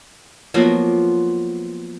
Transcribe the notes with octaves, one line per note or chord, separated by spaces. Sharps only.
F3 F#3 A#3 B3